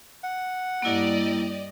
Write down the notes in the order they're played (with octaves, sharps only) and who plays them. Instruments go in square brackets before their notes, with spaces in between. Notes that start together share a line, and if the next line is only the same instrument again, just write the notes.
[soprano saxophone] F#5
[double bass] G2 G3 [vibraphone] A#3 E4 [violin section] G4 D5 D#5